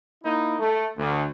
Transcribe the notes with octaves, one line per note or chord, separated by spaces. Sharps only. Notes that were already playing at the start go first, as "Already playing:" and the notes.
A#3 D#4 E4
A3
D2